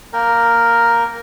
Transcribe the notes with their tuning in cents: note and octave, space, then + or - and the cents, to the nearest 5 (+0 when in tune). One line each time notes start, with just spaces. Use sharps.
A#3 +0 A#4 +0 G5 +0